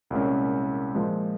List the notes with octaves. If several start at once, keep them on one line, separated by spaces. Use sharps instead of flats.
C2 A#2 G#3 C#4
A#2 F3 G#3